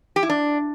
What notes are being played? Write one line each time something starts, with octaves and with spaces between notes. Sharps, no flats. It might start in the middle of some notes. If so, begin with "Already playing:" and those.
G4
E4
D4